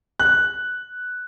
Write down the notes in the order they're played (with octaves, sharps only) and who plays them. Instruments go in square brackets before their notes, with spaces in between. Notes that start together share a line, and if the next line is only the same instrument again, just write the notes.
[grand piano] F#6